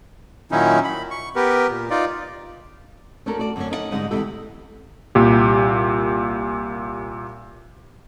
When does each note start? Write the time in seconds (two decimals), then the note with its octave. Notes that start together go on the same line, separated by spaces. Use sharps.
0.52 A#2 D#3 F#3 C#4 D#4 E4
0.84 B5
1.11 C#6
1.36 B3 G4 A#4 B4
1.69 A#2
1.90 D#4 F4 D5
3.26 A3 C#4 D4 F#4 A4 A#4
3.39 F#4 D5
3.56 F#2 D3 C4 C#4
3.70 C#4 D#4 C5 F#5
3.91 G#2 D3 G3 G#3 D#4 F#5
4.11 E2 C3 G#3 E4 G4 A4
5.15 C2 A#2 G4